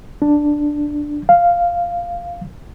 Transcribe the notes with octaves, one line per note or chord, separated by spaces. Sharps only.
D4
F5